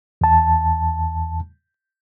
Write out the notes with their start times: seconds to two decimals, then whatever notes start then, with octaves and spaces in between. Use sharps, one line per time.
0.21 E2 A5